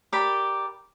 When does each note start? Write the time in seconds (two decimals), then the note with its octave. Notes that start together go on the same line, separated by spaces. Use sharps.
0.12 G4 A#4 D5 B5